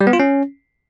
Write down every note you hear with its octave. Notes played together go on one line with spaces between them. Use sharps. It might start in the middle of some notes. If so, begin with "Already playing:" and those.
G3
B3
F4
C#4